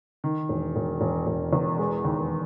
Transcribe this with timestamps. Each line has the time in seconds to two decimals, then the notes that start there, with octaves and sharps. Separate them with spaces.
0.24 D#3
0.49 E1
0.76 E1
1.01 E1
1.27 E1
1.53 E2
1.78 G#3
2.05 D#2